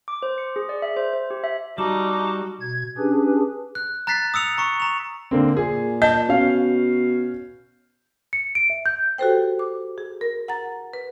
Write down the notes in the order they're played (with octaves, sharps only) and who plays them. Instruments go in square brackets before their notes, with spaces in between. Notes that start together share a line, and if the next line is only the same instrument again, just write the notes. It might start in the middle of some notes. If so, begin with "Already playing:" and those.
[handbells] D6
C5
C#7
G#4
D5
E5
C5
C5
G4
E5
[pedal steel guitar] G3 [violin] D#4 [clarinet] F#4 [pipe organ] A5 D6
[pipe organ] B2 G#6
C#4 D4 G4 G#4 B4
[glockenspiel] F#6
A#5 F#6 A6 B6 C7
D#6 E6 C#7 F7
A#5 C#6 C#7
A#5 F7
[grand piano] D3 A#3 C4
[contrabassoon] A#2 [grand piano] G#4
[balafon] D#5 [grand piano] A5 G6
[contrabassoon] B2 [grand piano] C#4 F5
[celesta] C#7
D7
E5
G6
[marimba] F#4 G4 A4 B4 C5 G5
D6
G#4
A#4
F#5 A#5 A6
B4